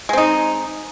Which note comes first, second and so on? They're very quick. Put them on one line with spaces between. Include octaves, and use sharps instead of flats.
G#3 C4 D#4